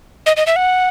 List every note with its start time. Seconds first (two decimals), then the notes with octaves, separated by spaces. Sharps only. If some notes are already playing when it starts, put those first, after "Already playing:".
0.26 D#5
0.37 D#5
0.47 E5
0.56 F#5